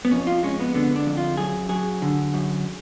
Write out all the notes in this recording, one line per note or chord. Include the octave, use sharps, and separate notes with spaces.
B3
F2 C#4
F4
G#3 C#4
B3
D3 B3
D4
F2
F4
F#2 G#4
F#3 G#4
D3
F#2